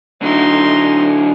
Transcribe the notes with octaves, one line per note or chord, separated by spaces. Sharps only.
D3 F#3 D#4 C6